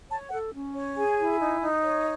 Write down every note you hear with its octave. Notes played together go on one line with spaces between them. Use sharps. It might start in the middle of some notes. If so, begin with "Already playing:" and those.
C#5 A5
A4 F#5
C#4
C#5
G#4 G#5
E4
D#4
D#4
C#5